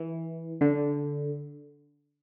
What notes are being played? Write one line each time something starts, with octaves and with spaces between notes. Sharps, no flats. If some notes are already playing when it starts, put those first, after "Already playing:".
Already playing: E3
D3